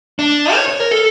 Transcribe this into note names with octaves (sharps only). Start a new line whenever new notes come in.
D4
C#5
C#5
A#4
A4